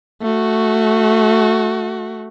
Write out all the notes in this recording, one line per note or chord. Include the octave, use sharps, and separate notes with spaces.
A3 F#4